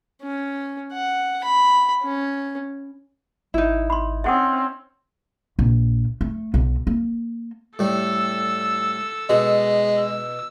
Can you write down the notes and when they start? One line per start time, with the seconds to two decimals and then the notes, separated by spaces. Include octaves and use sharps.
0.23 C#4
0.93 F#5
1.44 B5
2.03 C#4
3.54 G#1 D#4 E4
3.90 B5 C6
4.24 C4 C#4 E5 F#5 D#6
5.59 A#1
6.21 A3
6.54 B1
6.87 A#3
7.79 A2 G3 A4 E6
9.30 B2 G#3
9.98 E6